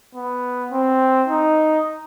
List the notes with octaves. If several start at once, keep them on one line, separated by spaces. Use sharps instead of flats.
B3
C4
D#4